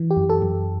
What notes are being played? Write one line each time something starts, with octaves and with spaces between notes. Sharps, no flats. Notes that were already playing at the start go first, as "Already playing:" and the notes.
Already playing: E3
G4
F#2
A4
F#2